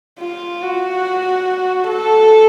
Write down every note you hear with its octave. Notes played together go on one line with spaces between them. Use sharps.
F4
F#4
A4